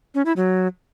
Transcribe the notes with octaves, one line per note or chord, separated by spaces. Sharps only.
C#4
E4
F#3